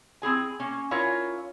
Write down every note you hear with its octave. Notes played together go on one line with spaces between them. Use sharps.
C4 E4 G#4 G#5
A#3 C#4
C#4 E4 F4 A#4 C#5